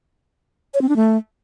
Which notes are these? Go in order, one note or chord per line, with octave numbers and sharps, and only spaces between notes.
C#5
C4
D4
A3